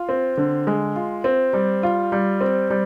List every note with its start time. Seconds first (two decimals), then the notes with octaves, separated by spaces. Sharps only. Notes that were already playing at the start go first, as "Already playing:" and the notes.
Already playing: F4
0.09 C4
0.37 D3
0.67 G#3
0.96 F4
1.24 C4
1.53 G3
1.83 F4
2.12 G3
2.41 C4
2.70 G3